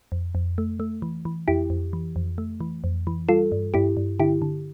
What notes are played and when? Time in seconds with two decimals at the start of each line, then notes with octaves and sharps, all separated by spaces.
0.12 F2
0.35 F2
0.58 A3
0.80 A3
1.02 E3
1.25 E3
1.48 F2 E4 G4
1.70 F2
1.93 E3
2.16 F2
2.38 A3
2.61 E3
2.84 F2
3.07 E3
3.29 G3 F4 A4
3.52 G2
3.74 G2 E4 G4
3.97 G2
4.19 D3 E4 G4
4.42 D3